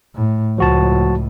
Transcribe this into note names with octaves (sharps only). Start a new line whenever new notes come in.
A2
C#2 A2 F3 F#4 A5